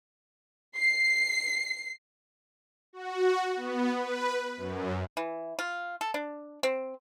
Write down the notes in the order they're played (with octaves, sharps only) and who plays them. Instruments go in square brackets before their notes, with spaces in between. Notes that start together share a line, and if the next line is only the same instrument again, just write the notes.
[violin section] C7
[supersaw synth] F#4
B3
B4
F#2
[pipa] E3
F4
A4
D4
C4